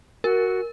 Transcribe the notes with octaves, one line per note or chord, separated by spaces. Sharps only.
F#4 A#4